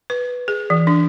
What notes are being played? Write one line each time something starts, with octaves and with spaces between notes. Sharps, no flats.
B4
G#4
E3
D4